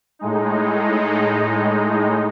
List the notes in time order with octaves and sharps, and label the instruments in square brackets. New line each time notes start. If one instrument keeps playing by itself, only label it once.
[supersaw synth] A2 G#3 D#4